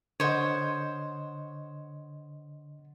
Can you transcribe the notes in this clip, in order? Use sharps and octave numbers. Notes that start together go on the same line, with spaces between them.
D3 C5 C#5 D#5 F#5